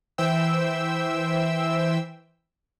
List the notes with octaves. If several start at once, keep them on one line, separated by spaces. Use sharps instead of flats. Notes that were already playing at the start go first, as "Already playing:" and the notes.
E3 C5 E5 G5 E6